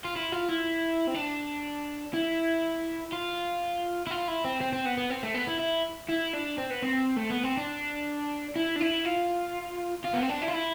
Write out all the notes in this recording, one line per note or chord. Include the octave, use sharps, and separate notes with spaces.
F4
E4
F4
E4
C4
D4
E4
F4
E4
F4
E4
C4
C4
C4
B3
B3
C4
A3
B3
E4
E4
E4
D4
C4
B3
C4
A3
B3
C4
D4
E4
D4
E4
F4
F4
B3
C4
D4
E4
F4
E4